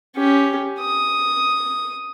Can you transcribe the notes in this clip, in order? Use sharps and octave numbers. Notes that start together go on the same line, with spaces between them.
C#4 G4
D#6